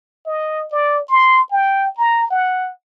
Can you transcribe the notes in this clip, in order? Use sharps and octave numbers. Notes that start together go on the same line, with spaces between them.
D#5
D5
C6
G5
A#5
F#5